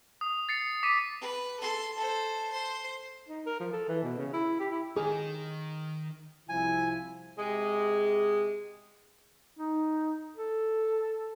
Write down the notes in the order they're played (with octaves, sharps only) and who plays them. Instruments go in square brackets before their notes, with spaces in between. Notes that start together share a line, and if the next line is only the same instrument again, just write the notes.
[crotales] D#6
A6 C7 C#7
D6 B6 C#7 D#7
[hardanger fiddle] B4
A4 C6
A4 C5
C5 C6
[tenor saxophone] D#4
A#4
F3
A4
E3
B2
C#3
E4
G4
E4
[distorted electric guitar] D#3 D#4 [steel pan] G#4
[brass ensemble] C2 F3 E4 [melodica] G#5
[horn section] C3 G#3
[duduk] D#4
A4